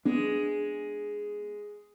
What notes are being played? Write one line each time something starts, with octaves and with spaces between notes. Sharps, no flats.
G#3 B3 D4